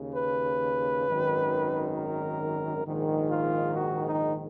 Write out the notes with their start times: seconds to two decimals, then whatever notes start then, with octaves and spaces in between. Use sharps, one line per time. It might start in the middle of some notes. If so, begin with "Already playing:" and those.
Already playing: D#2 C#3
0.14 B4
1.06 G#1 F#2 D#3
1.95 A#4
2.85 A#1 G#2 D#3
3.30 F4
3.75 F#4
4.05 D#4